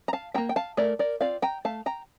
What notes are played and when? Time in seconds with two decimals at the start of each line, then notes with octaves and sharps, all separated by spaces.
0.08 A#5
0.13 F5 A5
0.34 A#3 E4 G5 A#5
0.49 G5
0.56 F5 A5
0.77 A3 A#4 D5
0.99 A#4 D5
1.21 C4 F4 D5 F5
1.42 G5 A#5
1.65 A3 F5 A5
1.86 G5 A#5